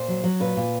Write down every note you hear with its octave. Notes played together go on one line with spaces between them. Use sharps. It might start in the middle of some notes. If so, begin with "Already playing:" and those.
Already playing: A#2 C5
F#3
F#3
A#2 B4
A#2